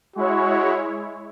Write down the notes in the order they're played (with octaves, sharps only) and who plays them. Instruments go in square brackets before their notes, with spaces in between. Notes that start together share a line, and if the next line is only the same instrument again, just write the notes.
[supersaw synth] G#3 E4 C#5 [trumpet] F#4